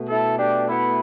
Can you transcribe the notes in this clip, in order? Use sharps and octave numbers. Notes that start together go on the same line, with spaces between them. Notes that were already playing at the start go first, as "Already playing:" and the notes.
Already playing: B2 A3
E4 A4
D4 G4
B3 E4